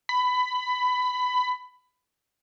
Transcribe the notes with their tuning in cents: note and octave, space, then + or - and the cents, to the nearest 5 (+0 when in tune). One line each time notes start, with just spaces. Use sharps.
B5 +15